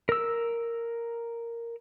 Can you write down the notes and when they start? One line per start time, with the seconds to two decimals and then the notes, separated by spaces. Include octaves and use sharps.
0.09 A#4 E6